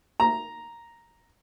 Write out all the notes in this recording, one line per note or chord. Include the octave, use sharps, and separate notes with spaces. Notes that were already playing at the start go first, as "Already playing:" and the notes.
A#5